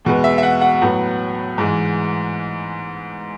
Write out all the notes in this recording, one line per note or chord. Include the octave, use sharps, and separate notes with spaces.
E2 B2 G#3 B3
E5
E5
F#5
F#5
A2 F#3 B3
G#2 E3 G#3